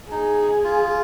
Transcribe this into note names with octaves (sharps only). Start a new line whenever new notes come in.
D#4 G#4
F4